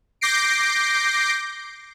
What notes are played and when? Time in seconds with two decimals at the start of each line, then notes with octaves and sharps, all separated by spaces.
0.21 D6 G6 A#6 C7 D7